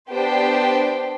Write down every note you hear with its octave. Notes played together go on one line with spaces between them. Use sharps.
B3 D4 G4 C5 G5